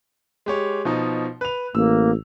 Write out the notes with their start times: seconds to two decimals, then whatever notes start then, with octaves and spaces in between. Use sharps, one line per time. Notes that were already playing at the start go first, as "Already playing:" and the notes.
0.46 G#3 G4 C#5
0.85 B2 F3 D#4
1.41 B4 F7
1.75 A1 A#3 E6